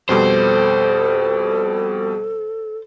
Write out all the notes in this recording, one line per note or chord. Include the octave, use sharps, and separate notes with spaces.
F2 B2 G3 A4 C5